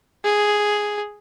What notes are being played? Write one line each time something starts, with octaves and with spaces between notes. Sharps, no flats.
G#4